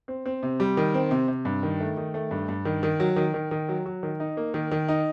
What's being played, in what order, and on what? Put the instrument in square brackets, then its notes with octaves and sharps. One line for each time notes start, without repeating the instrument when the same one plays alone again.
[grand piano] C4
C4
C3
G3
D#3
C4
C3
C3
G2
D#3
A3
D#3
A3
G2
G2
D#3
D#3
F#3
D#3
D#3
D#3
F#3
F#3
D#3
D#4
A#3
D#3
D#3
D#4